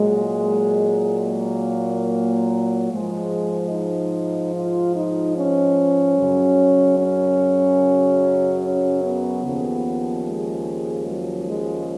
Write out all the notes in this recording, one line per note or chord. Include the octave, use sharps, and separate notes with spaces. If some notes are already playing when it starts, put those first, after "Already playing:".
Already playing: A#2 F#3 G#3
A#3
G#2 F3 G#3
D#4
F4
D#4
C#4
F#2 C#3 F#3
C#4
C#4
B3
D#2 C#3 F3
G#3
F#3
G#3